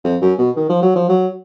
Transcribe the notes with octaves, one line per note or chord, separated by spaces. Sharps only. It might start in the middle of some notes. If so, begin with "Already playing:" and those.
F2
F#2
B2
D#3
F3
F#3
F3
F#3